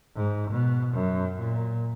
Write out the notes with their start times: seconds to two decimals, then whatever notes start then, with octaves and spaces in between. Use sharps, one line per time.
0.16 G#2
0.51 B2
0.94 F#2
1.39 A#2